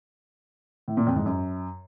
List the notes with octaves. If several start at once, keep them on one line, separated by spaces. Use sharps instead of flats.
A2
A#2
F2
G#2
F#2